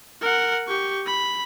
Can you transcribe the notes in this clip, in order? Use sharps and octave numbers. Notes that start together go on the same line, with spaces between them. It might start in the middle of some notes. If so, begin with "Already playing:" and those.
A#4 F#5
G4 C#6
B5